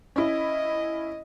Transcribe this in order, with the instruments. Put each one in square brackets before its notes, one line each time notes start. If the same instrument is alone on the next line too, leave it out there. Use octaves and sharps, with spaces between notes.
[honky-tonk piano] C#4 E4 [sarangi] D#5